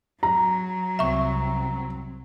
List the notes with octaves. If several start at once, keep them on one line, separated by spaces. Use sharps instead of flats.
F#3 A#5
C2 C4 E5 C#6